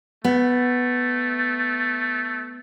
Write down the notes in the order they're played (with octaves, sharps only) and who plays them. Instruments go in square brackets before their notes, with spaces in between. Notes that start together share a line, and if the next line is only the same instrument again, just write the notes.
[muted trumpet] A3 [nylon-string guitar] B3